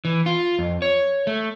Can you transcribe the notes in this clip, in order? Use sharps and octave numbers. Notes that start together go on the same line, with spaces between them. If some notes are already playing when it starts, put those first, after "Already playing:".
E3
F4
F2
C#5
A3